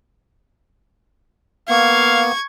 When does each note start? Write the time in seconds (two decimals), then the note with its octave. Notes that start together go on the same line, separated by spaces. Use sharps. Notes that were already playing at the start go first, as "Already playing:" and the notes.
1.69 A#3 B3 F5 C#6 G#6